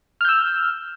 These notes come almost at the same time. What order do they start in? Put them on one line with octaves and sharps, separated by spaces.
F6 G6 E6